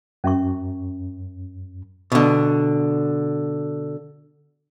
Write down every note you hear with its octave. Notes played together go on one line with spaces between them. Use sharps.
F#2 C#4 E5 C#6
B2 D3